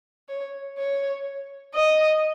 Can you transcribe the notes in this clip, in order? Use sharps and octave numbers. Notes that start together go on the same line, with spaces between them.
C#5
C#5
D#5